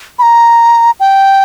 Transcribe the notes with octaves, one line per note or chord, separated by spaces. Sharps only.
B5
A#5
G5